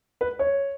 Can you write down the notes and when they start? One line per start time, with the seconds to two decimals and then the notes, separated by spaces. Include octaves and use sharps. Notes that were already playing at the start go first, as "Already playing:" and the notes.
0.21 B4
0.39 C#5